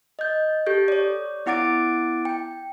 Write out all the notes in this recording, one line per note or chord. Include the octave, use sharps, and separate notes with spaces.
D#5 G6
G4 A4 G6
C#5 D5
B3 E4 F#5 D6 A6 D7
G5